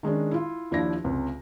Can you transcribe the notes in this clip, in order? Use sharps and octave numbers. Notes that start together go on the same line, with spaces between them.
D#3 G#3 C#4 D4
E4 F4
D#2 F3 D4 E4 A#6
C#2 C3